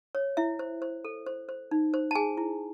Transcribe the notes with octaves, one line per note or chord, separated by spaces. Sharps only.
C#5
E4 E5
C5
C5
A4
C5
C5
D#4
C5
A5
G#4 G#5
E4